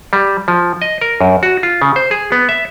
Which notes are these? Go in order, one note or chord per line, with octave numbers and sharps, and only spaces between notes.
G3
F3
D#5
A#4
F#2
F#4
F4
C#3
C5
G#4
B3
E5